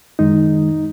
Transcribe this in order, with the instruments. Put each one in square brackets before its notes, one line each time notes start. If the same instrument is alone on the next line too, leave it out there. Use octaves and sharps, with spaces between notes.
[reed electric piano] F#2 D#3 G#3 D#4